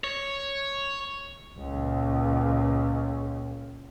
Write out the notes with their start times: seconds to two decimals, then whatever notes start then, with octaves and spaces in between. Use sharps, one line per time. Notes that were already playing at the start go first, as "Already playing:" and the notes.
0.04 C#5
1.59 C#2 A#2